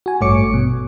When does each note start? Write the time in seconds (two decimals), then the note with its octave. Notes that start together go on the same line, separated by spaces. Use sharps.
0.06 F#4 G#5
0.21 A1 G2 A3 C#5 D6 C#7
0.54 B2